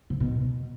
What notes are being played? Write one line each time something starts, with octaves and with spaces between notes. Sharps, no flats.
C3
B2